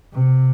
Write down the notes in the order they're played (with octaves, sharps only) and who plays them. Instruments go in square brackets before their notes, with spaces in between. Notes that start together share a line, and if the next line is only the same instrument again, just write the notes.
[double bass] C3